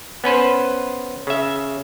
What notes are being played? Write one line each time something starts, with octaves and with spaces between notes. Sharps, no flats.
B3 C#4 B4 C5
C#3 E5